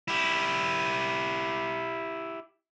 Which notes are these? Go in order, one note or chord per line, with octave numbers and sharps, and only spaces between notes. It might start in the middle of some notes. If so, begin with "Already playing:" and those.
E4 G4